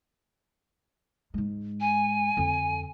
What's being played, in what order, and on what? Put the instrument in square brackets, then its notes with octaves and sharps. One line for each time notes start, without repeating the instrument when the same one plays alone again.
[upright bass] G#2 G#3
[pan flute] G#5
[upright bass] F2 D3